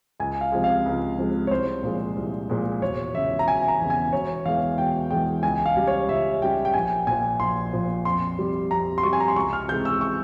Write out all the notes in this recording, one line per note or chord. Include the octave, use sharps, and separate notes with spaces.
C#2 G#5
F5
C3 F3 G#3
F5
C#2
C3 F3 G#3
C#5
C2 C5
A#2 F3 G#3
C2
A#2 F3 G#3
E1 C#5
E2 C#3 E5
A#5
E1 G#5
A#5
E2 C#3
G#5
E1 C#5
E2 E3 G#3 F5
E1 G5
E2 E3 G#3 G5
C#2 G#5
F5
C#3 G3
C#5
C#2 E5
C#3 G3 G5
G5
A#1 G#5
A#2 F3 G#5
A#1 C6
A#2 F3
F2 C6
C3 G3
F2 A#5
C6
C3 G3 C#6
G#5
A#5
C6
C#2 C#6
F6
C3 E3 G#3 G6
E6
C#6